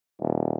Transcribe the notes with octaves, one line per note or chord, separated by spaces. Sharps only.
D#1